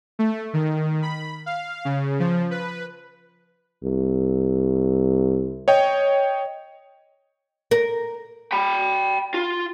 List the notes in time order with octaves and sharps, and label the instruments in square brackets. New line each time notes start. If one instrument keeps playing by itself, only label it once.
[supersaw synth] A3
D#3
B5
F5
C#3
F3
B4
[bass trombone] C2
[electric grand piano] C#5 D#5 G5
[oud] A#4
[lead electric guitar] G5 B5
F4